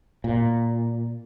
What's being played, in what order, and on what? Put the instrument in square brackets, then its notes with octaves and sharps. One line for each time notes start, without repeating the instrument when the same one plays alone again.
[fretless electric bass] A#2